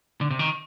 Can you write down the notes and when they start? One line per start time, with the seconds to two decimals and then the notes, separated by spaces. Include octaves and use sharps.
0.21 D3
0.31 C3
0.39 D#3